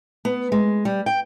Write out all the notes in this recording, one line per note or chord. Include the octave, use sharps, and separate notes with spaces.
B3
G#3
G3
G5